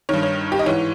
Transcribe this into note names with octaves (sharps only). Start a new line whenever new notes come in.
G2 D#3 C#5
C#5
G4
D#5
G#2 E3 C#5